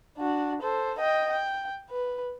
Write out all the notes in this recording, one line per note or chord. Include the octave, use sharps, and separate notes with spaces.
D4 F#4
A4 C5
D#5 G5
G5
B4